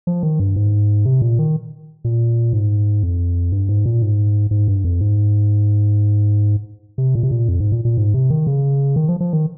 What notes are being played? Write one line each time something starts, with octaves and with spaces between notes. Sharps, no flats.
F3
D#3
G2
G#2
C3
A#2
D#3
A#2
G#2
F2
G2
G#2
A#2
G#2
G#2
G2
F2
G#2
C3
A#2
C3
A#2
F2
G#2
A#2
A#2
G#2
C3
D#3
C#3
D#3
F3
F3
D#3